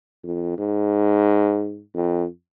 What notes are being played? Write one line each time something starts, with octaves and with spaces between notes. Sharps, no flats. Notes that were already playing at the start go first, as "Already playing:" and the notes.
F2
G#2
F2